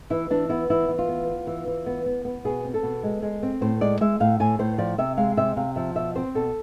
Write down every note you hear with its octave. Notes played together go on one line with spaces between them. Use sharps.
E3 E4
E3 D4
B3 E4
E3 E4
E3
F4
B3
B3
E3
E3
B3
B3
B3
B2 G#4
C4
A4
B2
G#3
G#3
C4
A2 C5
G#3 D5
G#3 E5
A2 F5
A2 G#5
A2 C5
F3 D5
C3 E5
G#3 F5
C3 E5
C3 F5
F3 E5
B2 E5
C4 C5
B2 A4